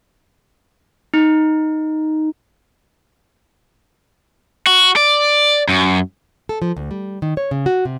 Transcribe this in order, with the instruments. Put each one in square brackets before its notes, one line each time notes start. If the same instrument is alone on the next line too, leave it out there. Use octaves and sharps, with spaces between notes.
[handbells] D#4
[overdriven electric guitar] F#4
D5
F#2
[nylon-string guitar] A4
F3
D2
G3
D#3
C#5
C#3
F#4
C3